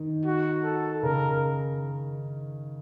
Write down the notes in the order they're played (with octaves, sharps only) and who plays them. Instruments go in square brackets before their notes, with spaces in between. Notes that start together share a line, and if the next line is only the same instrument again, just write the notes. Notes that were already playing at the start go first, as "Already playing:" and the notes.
Already playing: [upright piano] D#3
[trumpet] F#4
A4
[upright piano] C#3 [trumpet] A#4